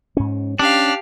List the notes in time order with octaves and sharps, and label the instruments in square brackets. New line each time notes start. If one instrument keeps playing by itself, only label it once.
[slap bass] G#2 C#4
[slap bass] C#4 [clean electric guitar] D4 [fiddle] G4 F5